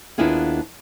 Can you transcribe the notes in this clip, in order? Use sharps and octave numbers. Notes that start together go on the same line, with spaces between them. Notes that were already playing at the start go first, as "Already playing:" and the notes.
D#2 B3 D4 E4 F4 G#4